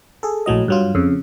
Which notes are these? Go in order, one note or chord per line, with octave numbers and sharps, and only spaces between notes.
G#4 A4
A#1 A2 F#3 D#5
G2 F#3 F4
F2 C#3